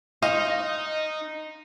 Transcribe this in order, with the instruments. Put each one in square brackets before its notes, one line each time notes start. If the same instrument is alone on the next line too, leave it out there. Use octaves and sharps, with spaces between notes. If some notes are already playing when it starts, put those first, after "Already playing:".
[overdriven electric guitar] D#4 [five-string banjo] C5 D#5 F5